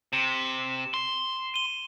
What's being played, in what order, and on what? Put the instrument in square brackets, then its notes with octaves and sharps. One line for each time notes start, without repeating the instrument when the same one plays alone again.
[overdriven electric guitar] C3 [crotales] E7
[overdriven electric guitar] C6
[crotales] D#7 G7